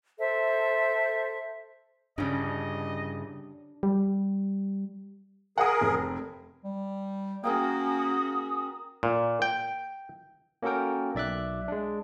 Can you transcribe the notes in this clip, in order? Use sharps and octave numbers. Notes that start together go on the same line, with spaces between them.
A4 C5 E5
G2 C#3 G3 C#4 D4 D#5
G3
G#4 A#4 F#5 D#6
F1
G3
A#3 C#4 F#4 G#4 A#4 G5 D#6
A#2
G5
A#3 C#4 F#4 A4 A#4 G5
B1 D5 E5 D6 F#6
G#3 D4